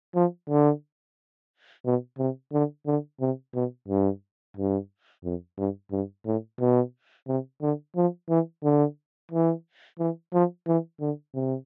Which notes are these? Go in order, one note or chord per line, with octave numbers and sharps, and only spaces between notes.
F3
D3
B2
C3
D3
D3
C3
B2
G2
G2
F2
G2
G2
A2
B2
C3
D3
F3
E3
D3
E3
E3
F3
E3
D3
C3